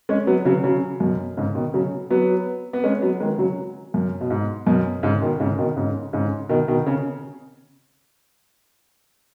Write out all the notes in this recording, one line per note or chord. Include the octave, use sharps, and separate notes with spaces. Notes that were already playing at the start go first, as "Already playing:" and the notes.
G#3 C#4
F#3 B3
C#3 F#3
C#3 F#3
F#2 B2
G#2 C#3
B2 D#3
C#3 F#3
F#3 B3
B3
G#3 C#4
F#3 B3
D#3 G#3
C#3 F#3
F#2
B2
G#2
F#2 B2
G#2 C#3
B2 D#3
G#2 C#3
B2 D#3
G#2 C#3
G#2 C#3
B2 D#3
B2 D#3
C#3